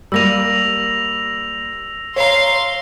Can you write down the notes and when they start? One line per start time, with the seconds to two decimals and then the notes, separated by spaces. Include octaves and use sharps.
0.12 G3 A#3 E6 A#6 D#7 F7
2.16 C#5 F5 A#5 C6